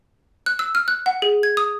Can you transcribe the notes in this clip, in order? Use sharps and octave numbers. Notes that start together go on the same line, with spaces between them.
F#6
E6
F6
F#6
F#5
G#4
G#6
D#6